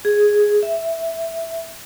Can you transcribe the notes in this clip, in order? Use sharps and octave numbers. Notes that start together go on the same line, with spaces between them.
G#4
E5